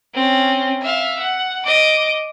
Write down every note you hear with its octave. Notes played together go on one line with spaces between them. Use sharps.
C4 C#4
E5 F5
F#5
D#5 D6